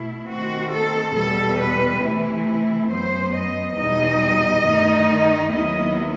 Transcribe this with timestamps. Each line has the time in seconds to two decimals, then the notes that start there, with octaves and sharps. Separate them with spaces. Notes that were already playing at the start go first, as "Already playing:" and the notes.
Already playing: B2 A3 E4
0.29 D#3 A3 C4 F#4
0.73 A4
1.17 E2 B2 G3 A4
1.60 B4
2.04 C3 E3 A3 E4
2.91 F#2 F#3 B3 C5
3.35 D#5
3.78 E2 B2 G3 D#4 D#5
4.65 G2 D#3 A3 D#4
5.52 D#2 D#3 F#3 B3 E4 D#5